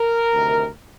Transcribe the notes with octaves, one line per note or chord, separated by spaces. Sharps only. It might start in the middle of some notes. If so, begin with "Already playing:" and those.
Already playing: A#4
D2 C3 D#3